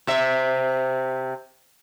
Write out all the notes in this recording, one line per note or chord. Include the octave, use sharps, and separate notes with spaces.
C3 E5